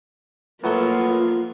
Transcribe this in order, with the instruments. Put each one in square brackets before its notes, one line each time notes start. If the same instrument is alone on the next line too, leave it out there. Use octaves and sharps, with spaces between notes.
[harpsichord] A2 F#3 A4 [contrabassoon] F3 [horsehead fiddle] A#3 F4 [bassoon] B3